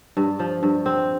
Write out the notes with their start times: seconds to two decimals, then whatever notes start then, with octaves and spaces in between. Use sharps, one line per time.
0.17 G2
0.39 F3
0.63 G2
0.86 C4